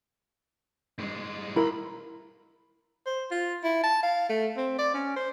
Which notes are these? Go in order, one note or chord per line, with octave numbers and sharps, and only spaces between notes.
G2 G#3
E4 A#4 B5 C6
C5
F4
E4
A5
F5
A3
C4
D5
C#4
C5